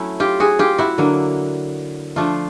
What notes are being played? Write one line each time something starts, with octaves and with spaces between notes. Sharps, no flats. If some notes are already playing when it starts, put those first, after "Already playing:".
Already playing: F#3 A3 C#4 E4
F4 G4
F#4 G#4
F4 G4
E4 F#4
D3 F#3 A#3
F3 A3 D4 F4